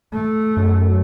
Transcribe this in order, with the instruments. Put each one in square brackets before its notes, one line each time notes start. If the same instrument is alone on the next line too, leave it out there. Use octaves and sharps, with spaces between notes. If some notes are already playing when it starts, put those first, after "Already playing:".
[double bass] A3
[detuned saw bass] F#2